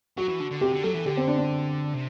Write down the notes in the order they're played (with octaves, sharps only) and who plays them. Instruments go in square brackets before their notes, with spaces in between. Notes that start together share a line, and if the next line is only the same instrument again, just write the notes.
[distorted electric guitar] F#3 [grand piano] F#4
[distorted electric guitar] E3
D3
D3
[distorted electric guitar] C3 [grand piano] G4
[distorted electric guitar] D3
[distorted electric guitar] F#3 [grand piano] A4
[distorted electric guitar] E3
[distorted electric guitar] D3 [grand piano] G4
[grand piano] C4
D4
D4
[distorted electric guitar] C3